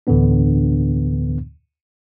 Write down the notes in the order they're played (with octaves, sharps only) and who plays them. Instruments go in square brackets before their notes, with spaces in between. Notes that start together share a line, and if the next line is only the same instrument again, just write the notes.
[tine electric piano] D2 A2 D3 E3 B3 D4